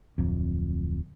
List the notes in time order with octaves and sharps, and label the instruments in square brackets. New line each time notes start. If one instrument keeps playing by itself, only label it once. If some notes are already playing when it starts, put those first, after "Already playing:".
[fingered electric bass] D1 F2